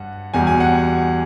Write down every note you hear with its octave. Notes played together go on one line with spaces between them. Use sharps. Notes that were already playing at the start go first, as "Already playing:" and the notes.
Already playing: G2 F#5
E2 B2 G3 G#5
G#5
F#5